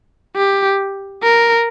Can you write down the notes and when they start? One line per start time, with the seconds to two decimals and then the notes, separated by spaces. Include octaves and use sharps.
0.36 G4
1.23 A#4